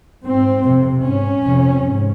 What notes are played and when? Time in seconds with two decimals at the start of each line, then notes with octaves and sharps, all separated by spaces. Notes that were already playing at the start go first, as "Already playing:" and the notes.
0.24 G#2 C4
0.63 F2 C3
1.03 G#2 C#4
1.43 F2 C3
1.83 G#2